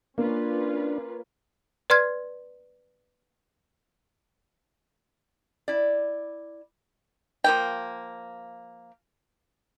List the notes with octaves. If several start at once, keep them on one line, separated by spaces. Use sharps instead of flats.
A#3 C#4 D4 F4 B4
B4 D5 C6 F6 G#6
E4 D5
F3 A#3 G5